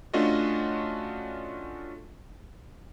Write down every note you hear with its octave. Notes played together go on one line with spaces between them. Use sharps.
A3 C#4 D4 F4 F#4 D#5